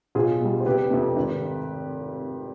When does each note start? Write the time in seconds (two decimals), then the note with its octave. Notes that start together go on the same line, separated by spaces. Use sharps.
0.15 B1 F4 G#4
0.40 B2 G3
0.60 C5
0.66 F1 G4 B4
0.90 F2 C3
1.16 G#1